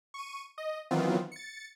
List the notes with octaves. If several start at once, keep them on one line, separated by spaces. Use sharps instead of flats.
C#6 D#7
D#5
D#3 E3 F#3 B3 C4 F4
A6 C#7